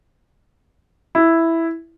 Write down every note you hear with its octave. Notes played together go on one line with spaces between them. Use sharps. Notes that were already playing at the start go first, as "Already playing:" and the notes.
E4